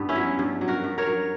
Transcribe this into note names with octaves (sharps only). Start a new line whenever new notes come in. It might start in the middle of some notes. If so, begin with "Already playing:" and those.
Already playing: G2 B3
C#4 E4
F#3
G2
F#3
F#4 A#4
G2
A#4 C#5
F#3